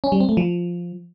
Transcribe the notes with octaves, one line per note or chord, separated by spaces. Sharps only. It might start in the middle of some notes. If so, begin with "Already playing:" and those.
C#4
G3
C4
A3
F3